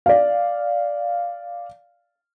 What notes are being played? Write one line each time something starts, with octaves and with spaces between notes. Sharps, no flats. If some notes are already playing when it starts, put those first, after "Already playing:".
D5 F5